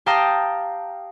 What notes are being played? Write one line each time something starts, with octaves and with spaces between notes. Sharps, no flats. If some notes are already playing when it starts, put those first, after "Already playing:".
G4 F5 G5 A5 A#5 D#6